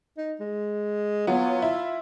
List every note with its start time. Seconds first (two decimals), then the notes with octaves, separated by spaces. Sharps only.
0.17 D#4
0.40 G#3
1.27 F#3 B3 F4
1.62 E4